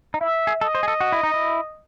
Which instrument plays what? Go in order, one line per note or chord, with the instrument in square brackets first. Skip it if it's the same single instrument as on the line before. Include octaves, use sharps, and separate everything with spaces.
[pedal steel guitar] D#4
[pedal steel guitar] E4 [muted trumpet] E5
[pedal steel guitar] G#4
[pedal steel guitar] A4 [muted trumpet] D#5
[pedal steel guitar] C5
G#4
A4
F#4
E4
D#4
E4